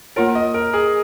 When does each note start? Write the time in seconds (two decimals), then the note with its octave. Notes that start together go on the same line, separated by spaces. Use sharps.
0.16 A#3 F4 A#4 C#5
0.35 D#5
0.54 A#4
0.74 G#4